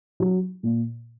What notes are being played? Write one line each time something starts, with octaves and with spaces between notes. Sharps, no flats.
F#3
A#2